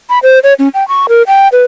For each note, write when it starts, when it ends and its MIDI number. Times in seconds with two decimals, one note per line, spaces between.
0.10 0.19 83
0.23 0.39 72
0.43 0.54 73
0.59 0.68 61
0.74 0.86 79
0.88 1.07 85
1.09 1.23 70
1.27 1.48 79
1.52 1.64 71